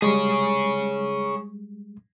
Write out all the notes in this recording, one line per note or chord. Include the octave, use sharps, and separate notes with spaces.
G3 G#3 G#4 C#5